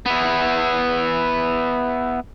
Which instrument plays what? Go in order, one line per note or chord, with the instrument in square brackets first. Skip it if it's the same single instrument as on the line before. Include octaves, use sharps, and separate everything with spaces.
[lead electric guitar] B3 E4